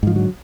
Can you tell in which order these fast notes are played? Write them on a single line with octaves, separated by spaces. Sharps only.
G#2 F3 D3 F#3